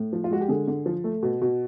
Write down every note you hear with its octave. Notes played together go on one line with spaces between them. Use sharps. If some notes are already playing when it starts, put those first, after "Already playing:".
Already playing: A2
F3
F4
G#3 F#4
G4
D3 G#4
D3
F3
A3
B2
B2